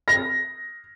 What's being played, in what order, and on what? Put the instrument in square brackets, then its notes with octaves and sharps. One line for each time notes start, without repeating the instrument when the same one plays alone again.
[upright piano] A#6